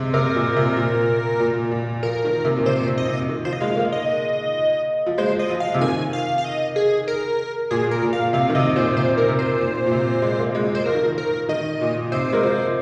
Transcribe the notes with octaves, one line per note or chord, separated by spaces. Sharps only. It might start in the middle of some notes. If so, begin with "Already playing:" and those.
Already playing: C3 G#3
C3 A#4
A#2
C3
A#2
A#2
A#2
F3 A#4
D#3
C3
A#2
C3 C5
C3
D#5
C3
D#3
F3 C5
D#5
G#3 F5
A#3
D#5
F3
G#3 C5
D#5
F3
F5
C3
D#3 G#5
F5
F5
D#5
G#4
A#4
A#2 G#4
A#4
A#2
F5
C3 F5
D#3
C3 D#5
A#2 C5
C3 C5
A#4
C3
C5
A#2
A#2
C3
G#3
A#3
G#3
C5
F3 A#4
D#3
F3
A#4
D#3 D#5
A#2
C3 C5
G#3 A#4
F3 C5